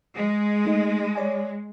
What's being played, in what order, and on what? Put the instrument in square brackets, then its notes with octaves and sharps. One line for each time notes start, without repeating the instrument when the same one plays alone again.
[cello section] G#3
[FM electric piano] A3 D#4 D#5
C#5 D5 G#5